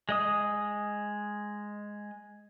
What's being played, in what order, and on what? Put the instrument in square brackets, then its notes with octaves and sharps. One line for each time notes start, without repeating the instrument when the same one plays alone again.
[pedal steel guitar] G#3 D#5 D#6